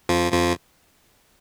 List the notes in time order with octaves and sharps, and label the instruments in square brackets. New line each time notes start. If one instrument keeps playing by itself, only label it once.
[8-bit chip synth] F2 F3
F2 F3